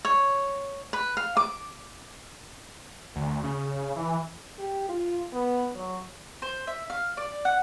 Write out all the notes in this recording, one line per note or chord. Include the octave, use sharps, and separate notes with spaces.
C#5
B4
F5
D6
D2
C#3
E3
G4
F4
B3
F#3
C5
E5
F5
D5
F#5